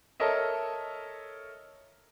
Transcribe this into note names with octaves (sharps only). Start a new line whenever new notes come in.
A4 A#4 C#5 D#5 E5